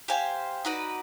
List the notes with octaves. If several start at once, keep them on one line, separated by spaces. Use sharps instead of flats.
G4 C5 F5 G#5
D#4 F#4 B4 D5